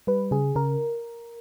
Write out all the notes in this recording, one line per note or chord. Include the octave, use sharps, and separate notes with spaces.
G3 B4
C#3 G#4
C#3 A#4